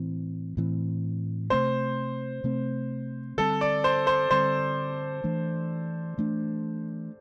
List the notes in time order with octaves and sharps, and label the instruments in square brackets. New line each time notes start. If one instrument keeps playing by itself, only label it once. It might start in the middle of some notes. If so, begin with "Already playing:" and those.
Already playing: [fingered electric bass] A2 E3 C4
A2 E3 C4
[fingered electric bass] C3 A3 C4 [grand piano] C5
[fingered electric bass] C3 A3 C4
[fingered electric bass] D3 G3 C4 [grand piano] A4
[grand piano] D5
C5
C5
[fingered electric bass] D3 G3 C4 [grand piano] C5
[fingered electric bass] E3 A3 D4
E3 A3 D4